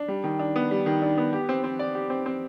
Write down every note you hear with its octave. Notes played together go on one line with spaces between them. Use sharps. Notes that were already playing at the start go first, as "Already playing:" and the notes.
Already playing: D4
G3
D#3
D4
B3
G3
D#3
D4
B3
G4
C4
C4
D5
G4
C4
C4